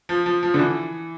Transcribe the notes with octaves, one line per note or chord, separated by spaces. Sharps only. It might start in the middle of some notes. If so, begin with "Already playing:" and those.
F3
F3
F3
D3
E3